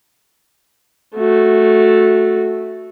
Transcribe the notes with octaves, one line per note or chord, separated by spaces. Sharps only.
A3 F#4